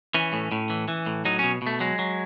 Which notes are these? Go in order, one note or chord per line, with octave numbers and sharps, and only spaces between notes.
E3 C#4
A2
A2
E3
E3
A2
F#3 D#4
B2 C#4
B2 A3
F#3 G#3
F#3